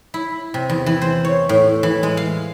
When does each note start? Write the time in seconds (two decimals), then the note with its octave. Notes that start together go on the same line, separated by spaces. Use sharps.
0.14 E4
0.54 C3
0.70 E2
0.86 E3
1.02 C5
1.25 C#5
1.49 A2
1.83 E3
2.03 G#3
2.17 F5